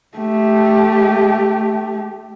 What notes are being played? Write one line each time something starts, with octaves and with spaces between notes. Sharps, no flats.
A3 G4